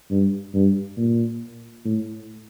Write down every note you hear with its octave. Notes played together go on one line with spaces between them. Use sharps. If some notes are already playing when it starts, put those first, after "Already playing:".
G2
G2
A#2
A2